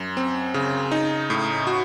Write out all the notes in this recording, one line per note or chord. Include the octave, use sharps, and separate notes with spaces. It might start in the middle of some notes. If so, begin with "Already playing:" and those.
Already playing: F#2
C4
C#3
D#4
A2
F#4